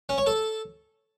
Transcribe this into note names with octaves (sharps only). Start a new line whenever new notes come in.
C#4
C#5
A4